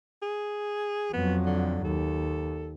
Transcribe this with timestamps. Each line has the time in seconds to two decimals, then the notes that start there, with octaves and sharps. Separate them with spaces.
0.22 G#4
1.13 F2 F#3 B3
1.45 D3
1.84 D#2 A4